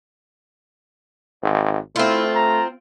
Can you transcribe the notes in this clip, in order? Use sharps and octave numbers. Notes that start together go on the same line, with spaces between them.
G#1
A3 C4 E4 F4
A#5